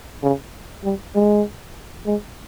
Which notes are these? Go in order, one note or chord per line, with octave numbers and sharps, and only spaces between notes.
C#3
G3
G#3
G#3